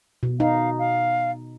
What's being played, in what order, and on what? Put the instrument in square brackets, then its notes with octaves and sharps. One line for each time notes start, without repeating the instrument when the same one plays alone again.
[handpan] B2
[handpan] D#4 [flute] F5
[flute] F5